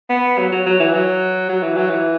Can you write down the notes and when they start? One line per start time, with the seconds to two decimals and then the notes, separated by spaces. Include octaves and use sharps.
0.10 B3
0.38 F#3
0.52 F#3
0.66 F#3
0.80 E3
0.94 F#3
1.49 F#3
1.63 E3
1.77 F#3
1.90 E3